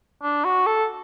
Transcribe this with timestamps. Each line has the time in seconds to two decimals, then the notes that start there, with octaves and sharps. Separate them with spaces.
0.22 D4
0.44 F#4
0.66 A4